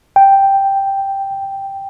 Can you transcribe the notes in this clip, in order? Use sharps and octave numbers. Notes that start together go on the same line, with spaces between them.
G5